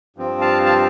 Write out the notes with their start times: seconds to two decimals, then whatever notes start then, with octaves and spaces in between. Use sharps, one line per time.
0.16 G2 F3 C4
0.41 F5 A5
0.65 F5 A5